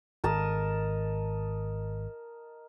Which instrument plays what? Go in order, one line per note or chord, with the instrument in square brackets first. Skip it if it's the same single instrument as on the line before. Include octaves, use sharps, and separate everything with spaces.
[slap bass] G#1 [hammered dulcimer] A#4 D#5 A5